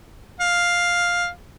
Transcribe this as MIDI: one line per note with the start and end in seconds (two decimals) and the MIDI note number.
0.40 1.28 77